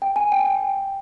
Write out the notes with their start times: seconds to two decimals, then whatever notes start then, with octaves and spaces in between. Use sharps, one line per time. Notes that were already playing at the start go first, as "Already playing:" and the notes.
0.02 G5
0.16 G#5
0.32 G5
0.39 G#5
0.46 G5